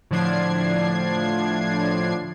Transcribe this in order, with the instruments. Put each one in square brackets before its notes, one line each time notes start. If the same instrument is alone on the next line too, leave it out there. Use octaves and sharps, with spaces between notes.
[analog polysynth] A2 D3 F3 D4 G#6 C7